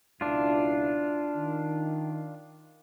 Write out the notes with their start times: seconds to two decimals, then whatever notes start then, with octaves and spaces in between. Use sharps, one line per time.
0.21 C#2 B2 D4 E4 F4
1.37 D#3